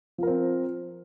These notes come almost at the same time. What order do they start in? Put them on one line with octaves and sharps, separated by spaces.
F3 A#4 C4